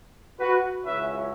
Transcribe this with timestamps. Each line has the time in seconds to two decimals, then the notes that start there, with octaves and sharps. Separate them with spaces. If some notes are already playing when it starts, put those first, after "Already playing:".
0.40 F#4 B4
0.85 C#2 C#3 F#3 C#4 E4 B4 E5